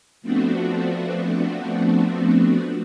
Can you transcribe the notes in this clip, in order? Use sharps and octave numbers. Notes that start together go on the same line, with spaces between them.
F3 A3 B3 C4 D4 F#4